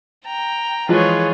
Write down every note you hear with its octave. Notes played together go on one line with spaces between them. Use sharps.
G5 A#5
E3 F3 G#3 F4 G#4 B4 C#5